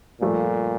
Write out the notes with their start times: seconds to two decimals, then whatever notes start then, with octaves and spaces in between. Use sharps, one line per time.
0.21 G2 A#2 F3 A3